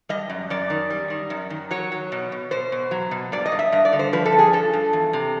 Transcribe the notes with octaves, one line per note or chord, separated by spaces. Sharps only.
G3 D#5
F#2
F#2 D5
D#3
G3
D#3
F#2
D#3
F#3 C#5
F#3
B2
B2
B2 C5
B2
F#3
B2
G2 D5
D#5
G2
E5
G2 D#5
D5
D3
C5
F3 B4
A4
G2
G#4
G2 A4
G2
E2
C3